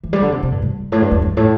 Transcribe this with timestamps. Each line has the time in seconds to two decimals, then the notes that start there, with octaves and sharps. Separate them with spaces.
0.04 E3
0.13 G3
0.22 D3
0.32 C3
0.43 C3
0.52 G2
0.62 G2
0.92 A2
1.02 G2
1.11 E2
1.22 G2
1.37 A2